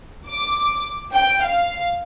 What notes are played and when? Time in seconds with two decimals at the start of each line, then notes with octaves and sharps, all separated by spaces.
0.28 D6
1.13 G5
1.44 F5